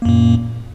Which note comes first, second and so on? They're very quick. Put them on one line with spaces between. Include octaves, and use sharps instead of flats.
A#3 F#2 A#2